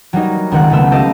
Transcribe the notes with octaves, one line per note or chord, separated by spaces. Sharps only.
F#3 G3 A#3 D#4
C#2 D#3 C4 F#5 F#6
C#3 A3 B3 E6
G4 A4 C5 D#5 F5